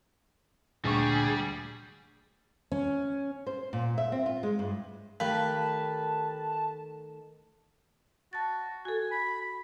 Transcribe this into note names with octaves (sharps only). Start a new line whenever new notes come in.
D2 A#2 G3 G#4 C#6
C#4
C5
A#2
E5
C4
F4
G#3
G2
D#3 A3 G4 A#4 B4 F5 A5
F#4 A5 A6
F#4 A4 G#5
B5
B5